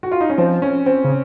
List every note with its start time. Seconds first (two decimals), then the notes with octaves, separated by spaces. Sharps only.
0.03 F#4
0.12 F4
0.21 D#4
0.30 C#4
0.38 F3 C4
0.62 C#4
0.86 C4
1.04 C#3